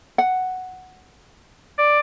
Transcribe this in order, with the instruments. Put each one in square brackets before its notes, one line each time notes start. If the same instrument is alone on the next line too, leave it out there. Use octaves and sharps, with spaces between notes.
[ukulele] F#5
[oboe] D5